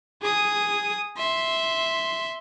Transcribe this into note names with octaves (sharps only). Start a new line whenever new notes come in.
G#4 D#6
E5 C6